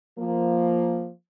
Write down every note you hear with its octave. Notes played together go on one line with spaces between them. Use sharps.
F3 A#3